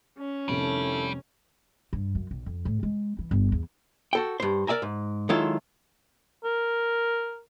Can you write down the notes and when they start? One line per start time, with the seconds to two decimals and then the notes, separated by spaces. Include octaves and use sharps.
0.19 C#4
0.49 F1 C3 D#3 G3 E4 A4 D7
1.93 G2
2.15 F#2
2.31 B1
2.46 F2
2.65 A2
2.83 G#3
3.19 E3
3.31 G1
3.52 E2
4.13 F#4 A4 G5
4.40 G2 C5
4.67 A#4 D5 E5 G#5 A#5
4.82 G#2
5.29 D#3 F#3 G#3 E4 F4 A4
6.45 A#4